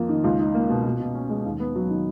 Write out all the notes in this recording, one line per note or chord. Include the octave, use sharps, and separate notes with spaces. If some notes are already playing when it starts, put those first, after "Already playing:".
Already playing: F2 A#3 F4
D#3
C#2
D#4
A#3
B2
B2
B2
C#4
G#3
D#2
B3
F#3
D#3